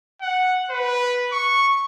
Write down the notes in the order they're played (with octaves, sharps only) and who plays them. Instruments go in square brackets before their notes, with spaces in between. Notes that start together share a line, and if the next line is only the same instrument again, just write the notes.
[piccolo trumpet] F#5
B4
C#6